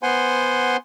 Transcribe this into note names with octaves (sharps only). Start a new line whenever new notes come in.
B3 C5 F#5 G#5 C6